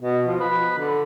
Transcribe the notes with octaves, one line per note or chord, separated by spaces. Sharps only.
B2
F3
B4
D3